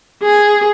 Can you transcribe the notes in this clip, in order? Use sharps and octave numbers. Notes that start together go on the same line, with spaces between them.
G#4